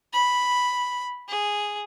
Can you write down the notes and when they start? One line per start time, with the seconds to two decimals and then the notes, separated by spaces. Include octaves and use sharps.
0.13 B5
1.29 G#4